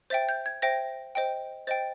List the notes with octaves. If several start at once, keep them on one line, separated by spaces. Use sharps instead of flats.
C5 E5 G5 A6
G6
G#6
C5 E5 G5 A#6
C5 D#5 G5
C5 D#5 G5 A6